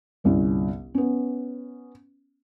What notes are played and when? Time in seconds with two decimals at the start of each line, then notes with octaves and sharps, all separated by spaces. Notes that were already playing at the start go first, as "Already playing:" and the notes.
0.24 G1 C2 C#4
0.94 B3 C#4